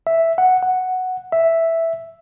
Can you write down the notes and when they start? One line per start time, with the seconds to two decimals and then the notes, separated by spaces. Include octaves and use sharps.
0.07 E5
0.38 F#5
0.63 F#5
1.32 E5